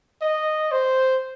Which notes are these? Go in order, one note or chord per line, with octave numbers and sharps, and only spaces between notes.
D#5
C5